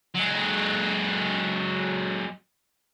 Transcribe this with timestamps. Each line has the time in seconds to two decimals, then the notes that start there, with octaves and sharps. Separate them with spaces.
0.15 F#3 G#3